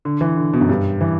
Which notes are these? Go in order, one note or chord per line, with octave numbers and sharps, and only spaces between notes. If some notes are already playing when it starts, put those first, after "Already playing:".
D3
E3
D3
B2
F#2
G2
E3